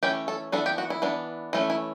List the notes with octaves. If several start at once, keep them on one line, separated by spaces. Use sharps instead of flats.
E3 A3 C#4 G4
A4
E3 B3 D4 A4
G4
F#4
E4
E3 B3 D4
E3 A3 C#4
E4